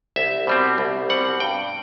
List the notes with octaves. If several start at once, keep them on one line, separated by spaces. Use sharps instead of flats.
C2 E5
B2 G3 C4
C2
B2 G3 C4 F#5
G2 G5